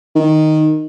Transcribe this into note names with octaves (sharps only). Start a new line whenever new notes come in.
D#3